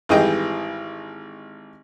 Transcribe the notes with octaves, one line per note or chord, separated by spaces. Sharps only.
G#1 E3 G3 G#4 D#5 G5